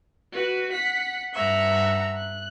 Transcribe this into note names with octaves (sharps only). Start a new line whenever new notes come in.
F#4 B4
F#5 B6
G2 E5 F#5 A#5
F#6